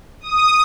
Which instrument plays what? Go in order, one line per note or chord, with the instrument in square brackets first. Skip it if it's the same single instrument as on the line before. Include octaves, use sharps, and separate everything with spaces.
[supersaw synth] D#6